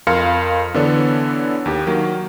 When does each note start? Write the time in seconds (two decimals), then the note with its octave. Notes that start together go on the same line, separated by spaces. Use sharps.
0.07 F2 A#4 F5 C6 F6 C#7
0.74 D3 E3 B3 D4 A4 C#5
1.66 D#2 G4
1.87 D#3 F#3 A#3